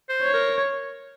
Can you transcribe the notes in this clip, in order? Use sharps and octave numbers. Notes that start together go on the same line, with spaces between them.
C5
C#5
A#4